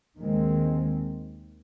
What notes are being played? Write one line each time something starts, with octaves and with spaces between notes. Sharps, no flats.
D#2 D#3 G#3 C4